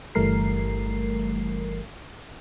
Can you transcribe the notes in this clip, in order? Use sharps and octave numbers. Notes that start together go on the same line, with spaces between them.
G1 E3 G3 A3 A#4 C7